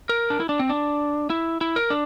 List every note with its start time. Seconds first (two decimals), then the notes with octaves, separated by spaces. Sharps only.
0.09 A#4
0.30 D4
0.40 E4
0.49 D4
0.59 C4
0.69 D4
1.30 E4
1.61 E4
1.76 A#4
1.90 D4